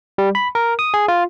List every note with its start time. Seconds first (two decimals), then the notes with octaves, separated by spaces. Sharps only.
0.18 G3
0.35 B5
0.55 A#4
0.79 D#6
0.94 G#4
1.08 F4